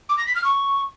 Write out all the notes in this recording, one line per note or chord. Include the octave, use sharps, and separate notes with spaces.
D6
A#6
B6
F6
C#6